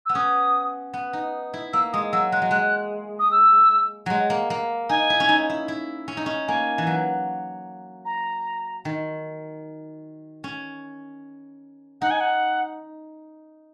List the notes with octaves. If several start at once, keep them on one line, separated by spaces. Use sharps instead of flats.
B3 E6
C#4 D#6
B3
D#4
E4
A#3 E6
G#3 D#6
F#3 E6
G#3 F#6
F#3
G#3 F#6
D#6
E6
F#3 G#3
A#3
A#3
D#4 G#5
E4
C#4
D#4
E4
E4
C#4
D#4
C#4
A#3 G#5
E3
F#3
A#5
D#3
C#4
D#4 F#5
G#5
F#5